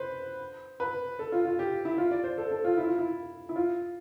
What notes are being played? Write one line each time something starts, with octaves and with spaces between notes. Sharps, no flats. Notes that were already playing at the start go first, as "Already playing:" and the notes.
Already playing: B4 C5
B4
A4
F4
F4
G4
E4
F4
D5
C5
A4
A4
F4
E4
F4
E4
E4
F4